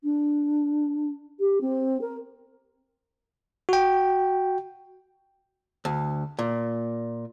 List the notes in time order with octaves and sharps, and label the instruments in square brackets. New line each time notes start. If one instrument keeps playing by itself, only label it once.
[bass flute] D4
G4
C4
A#4
[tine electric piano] F#4 G5
[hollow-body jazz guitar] D2
A#2